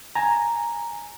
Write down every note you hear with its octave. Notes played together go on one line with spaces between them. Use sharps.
G#5 A#5